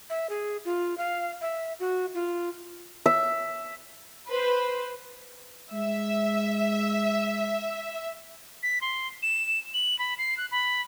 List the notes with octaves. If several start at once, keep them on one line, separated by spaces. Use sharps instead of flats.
E5
G#4
F4
F5
E5
F#4
F4
E5
B4 C5
G#3 E5
B6
C6
E7
F#7
B5
C7
F#6
B5